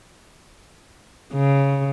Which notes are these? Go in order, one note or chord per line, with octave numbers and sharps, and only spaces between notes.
C#3